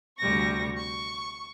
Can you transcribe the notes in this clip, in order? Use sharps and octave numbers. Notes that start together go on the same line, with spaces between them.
D2 C3 G3 C#6 A#6
C#6